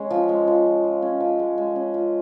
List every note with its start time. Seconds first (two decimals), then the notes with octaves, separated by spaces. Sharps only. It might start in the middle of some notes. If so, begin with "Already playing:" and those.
Already playing: G#3 C#4
0.11 F3
0.29 G#3
0.48 F3
0.66 F3
0.84 F3
1.02 C#4
1.20 F3
1.39 G#3
1.58 G#3
1.76 C#4
1.94 F4